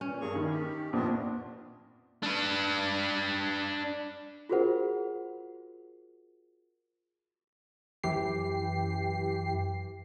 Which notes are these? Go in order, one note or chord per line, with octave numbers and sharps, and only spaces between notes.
A#2 E3 C#4
G2 A#3 G#4 C#6
D#3 E4
G4
A#1 F2 A#2 B3 C4 D4
D4 B4
F4 F#4 G#4 A#4 C5 F#5
F#2 E3 G4 C7